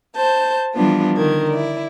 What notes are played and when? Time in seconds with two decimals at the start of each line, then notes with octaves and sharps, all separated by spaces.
0.16 C5 A5 G6
0.75 E3 F3 G3 B3 D4 F4
1.16 D3 D#3 G#6
1.51 E4 D5